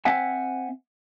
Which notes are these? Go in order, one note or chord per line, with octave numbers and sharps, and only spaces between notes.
C4 C5 E5 F#5 G#5